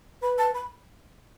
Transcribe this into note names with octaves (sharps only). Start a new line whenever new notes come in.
B4 B5
A5
B5